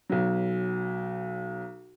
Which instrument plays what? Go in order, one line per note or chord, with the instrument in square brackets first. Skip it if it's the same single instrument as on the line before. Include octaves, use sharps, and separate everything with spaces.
[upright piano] B1 F#3